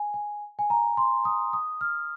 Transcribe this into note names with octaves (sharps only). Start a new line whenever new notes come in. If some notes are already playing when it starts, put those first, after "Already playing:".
Already playing: G#5
G#5
G#5
A#5
C6
D#6
D#6
F6